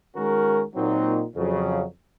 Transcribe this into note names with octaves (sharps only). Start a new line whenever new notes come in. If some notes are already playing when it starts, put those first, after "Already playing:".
D#3 G#3 C#4 F#4 A#4
A#2 F#3 C4 D#4
F2 C#3 F#3